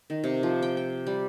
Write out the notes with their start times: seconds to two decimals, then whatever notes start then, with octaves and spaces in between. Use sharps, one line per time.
0.10 D#3
0.24 C3
0.43 F3
0.62 G5
0.77 G5
1.07 G3